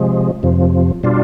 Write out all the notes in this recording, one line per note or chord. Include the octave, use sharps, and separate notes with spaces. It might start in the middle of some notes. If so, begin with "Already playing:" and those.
Already playing: C3 F3 G#3
F2 C3 F3
B2 G3 D4 F4